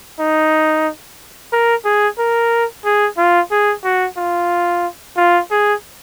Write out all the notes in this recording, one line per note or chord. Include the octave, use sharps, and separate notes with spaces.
D#4
A#4
G#4
A#4
G#4
F4
G#4
F#4
F4
F4
G#4